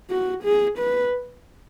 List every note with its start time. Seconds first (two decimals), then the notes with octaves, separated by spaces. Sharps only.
0.10 F#4
0.44 G#4
0.78 B4